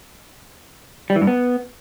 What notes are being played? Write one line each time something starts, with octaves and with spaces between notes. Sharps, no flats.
G3
E3
G2
B3